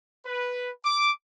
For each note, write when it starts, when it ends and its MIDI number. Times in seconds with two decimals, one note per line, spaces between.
0.25 0.70 71
0.84 1.11 86